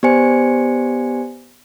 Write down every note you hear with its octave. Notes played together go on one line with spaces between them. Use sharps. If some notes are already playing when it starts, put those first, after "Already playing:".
B3 G4 C5 D5 G#5 C#7